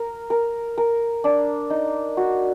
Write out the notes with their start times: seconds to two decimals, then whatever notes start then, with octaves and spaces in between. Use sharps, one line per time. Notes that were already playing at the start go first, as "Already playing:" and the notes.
Already playing: A#4
0.30 A#4
0.78 A#4
1.24 D4
1.70 D#4
2.17 F#4